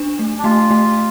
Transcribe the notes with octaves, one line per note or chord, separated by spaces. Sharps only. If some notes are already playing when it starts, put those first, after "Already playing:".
Already playing: D4
A3
D4
A3 F4
A3